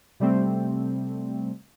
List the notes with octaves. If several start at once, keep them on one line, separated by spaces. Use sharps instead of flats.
C3 G3 A3 C4